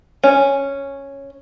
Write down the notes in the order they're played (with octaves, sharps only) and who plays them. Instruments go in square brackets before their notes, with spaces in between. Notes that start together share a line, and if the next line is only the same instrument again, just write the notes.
[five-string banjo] C#4